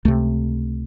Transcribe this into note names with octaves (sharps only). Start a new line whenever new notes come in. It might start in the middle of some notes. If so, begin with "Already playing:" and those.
C#2 C3 A3